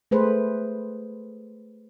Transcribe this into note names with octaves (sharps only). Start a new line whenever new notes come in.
A3 G#4 B4 C5